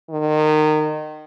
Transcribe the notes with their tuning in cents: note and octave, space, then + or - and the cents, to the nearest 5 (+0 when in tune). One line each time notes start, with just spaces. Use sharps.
D#3 -25